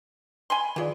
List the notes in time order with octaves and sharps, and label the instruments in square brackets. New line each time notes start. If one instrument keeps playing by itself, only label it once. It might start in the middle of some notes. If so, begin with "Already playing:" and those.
[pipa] G#5 B5 C6
[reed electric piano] D#3 F4 D5 [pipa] E3 G#4